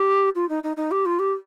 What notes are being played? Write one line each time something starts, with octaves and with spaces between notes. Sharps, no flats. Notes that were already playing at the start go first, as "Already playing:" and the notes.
Already playing: G4
F4
D#4
D#4
D#4
G4
F4
G4